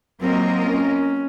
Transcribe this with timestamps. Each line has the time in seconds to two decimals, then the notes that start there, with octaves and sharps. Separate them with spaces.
0.20 F#3 A#3 C4 F4 A#4 D#5
0.63 C#4